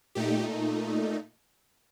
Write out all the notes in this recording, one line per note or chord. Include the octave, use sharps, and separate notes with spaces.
A#2 A3 D#4 G4